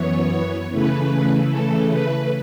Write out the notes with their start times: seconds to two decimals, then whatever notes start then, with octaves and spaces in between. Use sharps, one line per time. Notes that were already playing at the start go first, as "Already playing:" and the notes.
Already playing: F#2 E3 B3 C#5
0.72 C#3 E3 A3 B4
1.50 A4
1.90 B4